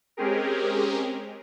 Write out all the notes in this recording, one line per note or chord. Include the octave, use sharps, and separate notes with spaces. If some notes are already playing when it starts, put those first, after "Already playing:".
G#3 C4 C#4 G4 G#4 A#4